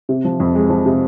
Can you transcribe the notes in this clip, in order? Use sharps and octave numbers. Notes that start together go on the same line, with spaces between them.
C3
F3
F2
G#3
F3
C3